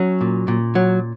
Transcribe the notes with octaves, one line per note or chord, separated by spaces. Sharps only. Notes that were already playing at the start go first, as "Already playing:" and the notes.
Already playing: F#3 C#4
A#2
A#2
F#3